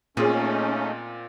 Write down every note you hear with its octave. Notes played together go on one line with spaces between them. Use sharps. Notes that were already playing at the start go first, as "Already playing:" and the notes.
A#2 A3 C4 C#4 D#4 F4 G#4